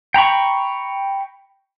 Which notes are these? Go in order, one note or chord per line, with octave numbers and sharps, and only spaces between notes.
G5 A#5 B5 C#6